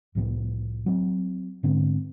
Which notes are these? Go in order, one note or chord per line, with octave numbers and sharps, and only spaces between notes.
C2 A2 F3 B3
F#3 C4
G#2 D3 B3 C4